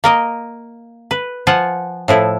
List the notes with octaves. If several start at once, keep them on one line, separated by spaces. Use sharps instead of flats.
A#3 A#4 D#5
B4
F3 F4 F#5 G#5
A2 F3 E4